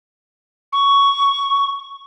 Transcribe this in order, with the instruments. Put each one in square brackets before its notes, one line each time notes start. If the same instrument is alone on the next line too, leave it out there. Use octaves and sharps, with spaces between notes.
[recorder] C#6